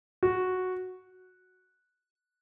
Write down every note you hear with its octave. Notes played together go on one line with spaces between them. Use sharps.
F#4